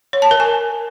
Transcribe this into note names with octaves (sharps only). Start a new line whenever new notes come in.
C#5
A5
A#4
G#5